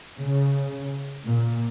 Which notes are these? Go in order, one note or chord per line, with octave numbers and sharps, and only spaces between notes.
C#3
A#2